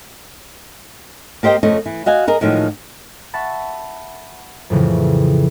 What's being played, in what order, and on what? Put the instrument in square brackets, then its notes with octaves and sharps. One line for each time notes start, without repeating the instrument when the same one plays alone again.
[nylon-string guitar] A#3 G4 C5 D#5 G5
F2 C#3 A3 D#5
E3
F#4 D#5 F5 G#5
G#4 A#4 D#5
A2 D#3 F3 F#3 G#3
[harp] E5 F#5 A5 B5 C#6 A6
F2 A2 C#3 E3 F3